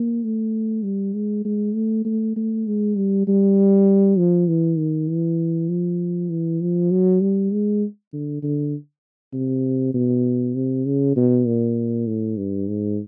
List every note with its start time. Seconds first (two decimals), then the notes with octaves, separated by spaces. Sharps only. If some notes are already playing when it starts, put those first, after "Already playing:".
Already playing: A#3
0.24 A3
0.84 G3
1.14 G#3
1.45 G#3
1.75 A3
2.05 A3
2.36 A3
2.67 G#3
2.96 G3
3.27 G3
4.18 F3
4.48 E3
4.78 D#3
5.09 E3
5.69 F3
6.30 E3
6.61 F3
6.91 F#3
7.21 G3
7.52 G#3
8.13 D3
8.43 D3
9.33 C3
9.94 B2
10.55 C3
10.86 C#3
11.16 B2
11.46 A#2
12.07 A2
12.37 G2
12.68 G#2